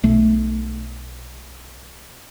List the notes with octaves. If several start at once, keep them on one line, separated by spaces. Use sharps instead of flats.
B1 A3